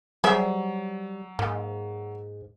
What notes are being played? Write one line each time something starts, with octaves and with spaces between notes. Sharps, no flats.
F#3 G3 G#4 C5 E5
G#2 A#3